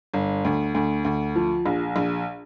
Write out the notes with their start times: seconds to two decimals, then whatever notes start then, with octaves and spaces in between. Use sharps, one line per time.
0.14 G1
0.45 D2
0.75 D2
1.05 D2
1.36 F3
1.66 A#1
1.96 A#1